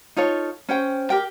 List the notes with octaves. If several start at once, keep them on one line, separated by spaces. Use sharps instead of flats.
D#4 F4 A4 C#5
C#4 C5 G5
G4 A#4 G5